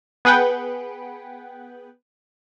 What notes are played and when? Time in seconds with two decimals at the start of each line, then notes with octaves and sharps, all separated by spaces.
0.25 B3 G#4 B4 F#5 G5